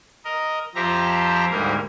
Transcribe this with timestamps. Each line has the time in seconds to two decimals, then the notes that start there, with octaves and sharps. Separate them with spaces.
0.25 A#4 D#5
0.75 F2 F3 G4 C5 E5 A#5
1.51 D2 G#2 G3 A#3 A#4